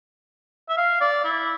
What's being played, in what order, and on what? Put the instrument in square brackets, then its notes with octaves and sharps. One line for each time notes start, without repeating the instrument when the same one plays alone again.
[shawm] E5
F5
D5
E4